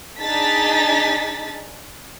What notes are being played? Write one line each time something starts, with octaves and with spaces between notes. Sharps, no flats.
D4 D#4 G#4 A5 A6 B6